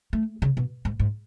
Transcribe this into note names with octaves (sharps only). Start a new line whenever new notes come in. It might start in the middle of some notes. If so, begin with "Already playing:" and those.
A3
C#3
B2
G#2
G#2